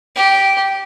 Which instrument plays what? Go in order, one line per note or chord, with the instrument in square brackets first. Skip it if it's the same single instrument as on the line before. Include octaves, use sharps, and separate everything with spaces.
[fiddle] G4